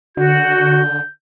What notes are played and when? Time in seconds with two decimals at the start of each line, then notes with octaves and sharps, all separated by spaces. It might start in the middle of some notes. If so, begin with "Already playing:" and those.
0.17 D3 F#4 G6